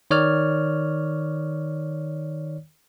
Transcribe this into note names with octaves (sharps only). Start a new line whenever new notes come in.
D#3 C#5 D5 F6